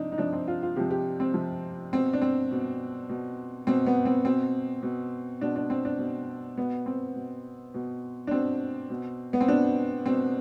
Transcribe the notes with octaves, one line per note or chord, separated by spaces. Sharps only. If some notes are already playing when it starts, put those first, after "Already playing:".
Already playing: C3 F3 D4 D#4
D#4
C3 F3 D4
C4
F4
F4
C3 F3 G4
G4
C4
C3 F3
B2 C4
D4
C4
B2
B2
B2 C4
B3
C4
B2 C4
B2
B2 D4
D4
C4
D4
B2
B2 B3
C4
B2
B2
D4
B2 C4
B2
B3
C4
B2 D4
B2 C4